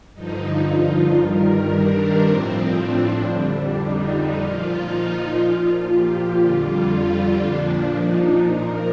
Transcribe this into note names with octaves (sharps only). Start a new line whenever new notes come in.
G2 D3 F3 D#4
F4
G2 D#3 G3 A#4
D4
A2 F3 C4
D4
F2 D3 G3 D4
D#4
A#2 F3 F4
D#4
A#2 F3 F4
G4
F2 D3 G3 F4
A#2 F3 D4
D#4
A#2 F3 A#4